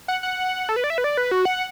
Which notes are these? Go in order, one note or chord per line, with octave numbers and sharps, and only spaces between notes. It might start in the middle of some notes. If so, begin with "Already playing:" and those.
F#5
F#5
A4
B4
D5
E5
B4
D5
B4
F#4
F#5